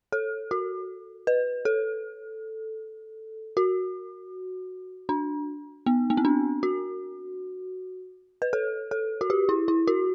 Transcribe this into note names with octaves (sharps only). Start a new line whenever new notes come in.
A4
F#4
B4
A4
F#4
D4
B3
B3
C4
D4
F#4
B4
A4
A4
F#4
G4
E4
E4
F#4